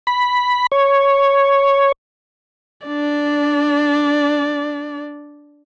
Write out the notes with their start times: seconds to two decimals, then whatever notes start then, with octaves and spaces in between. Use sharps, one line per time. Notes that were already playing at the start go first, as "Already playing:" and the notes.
0.07 B5
0.72 C#5
2.87 D4 D5